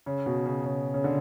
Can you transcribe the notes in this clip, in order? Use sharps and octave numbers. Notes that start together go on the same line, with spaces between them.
C#3
B2
C#3
C#3
C#3
D3